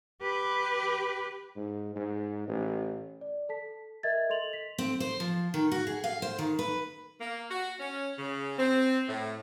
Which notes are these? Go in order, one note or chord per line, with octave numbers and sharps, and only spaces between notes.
G4 B4
G#2
G#2
A1
D5
A4 A5 B6
A#4 D#5 E5 G#6 A6
A4 D#5 C6 F7 F#7
B6
C4
C5
F3
D#3
F#4
G#4
F5
C5
D#3
B4
A#3
F#4
C#4
C#3
C4
A2